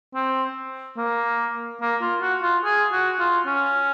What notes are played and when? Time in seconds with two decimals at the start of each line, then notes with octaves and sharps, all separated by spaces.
0.14 C4
0.97 A#3
1.81 A#3
2.01 F4
2.22 F#4
2.43 F4
2.64 G#4
2.92 F#4
3.19 F4
3.46 C#4